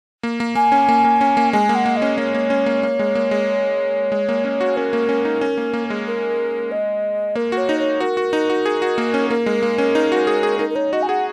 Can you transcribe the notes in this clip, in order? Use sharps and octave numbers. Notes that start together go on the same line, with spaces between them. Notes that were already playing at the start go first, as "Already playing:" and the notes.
A#3
A#3
A#3 G#5
C#4
A#3
A#3
C#4
A#3
G#3 G#5
A#3
F#5
A#3
D#5
C#4
A#3 C#5
A#3
C#4
A#3
A#3
G#3
A#3
G#3
G#3
A#3
C#4
F#4
C#4 A#4
A#3
C#4
D#4
C#4
A#3
A#3
G#3
A#4
D#5
A#3 A#4
F#4
C#5
D#4
C#5
F#4 A#4
F#4
D#4
F#4
G#4
F#4
A#3
C#4
A#3 A#4
G#3
A#3
C#4
D#4
F#4
G#4
G#4
D#4 A#4
A#4
D#4 C#5
F#4 D#5
G#5
G#4 F#5